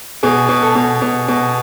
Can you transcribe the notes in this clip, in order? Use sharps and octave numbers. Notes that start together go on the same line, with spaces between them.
B2 G#4
B2
A4
B2
B2
B2